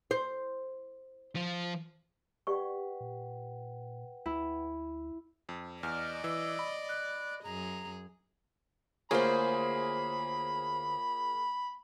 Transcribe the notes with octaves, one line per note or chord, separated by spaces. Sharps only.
C5
F3 F4
G4 B4 D5 F#5 G5 C#6
A#2
D2 E4
F2
E2 D5 D#5 F6
E3 E6
B5
F#6
F#2 G#4 A#5
D2 A#3 F4 G#4 C5 C#5 B5